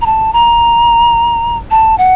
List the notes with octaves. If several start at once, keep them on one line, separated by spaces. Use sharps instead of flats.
A#5
A5
A#5
A5
F#5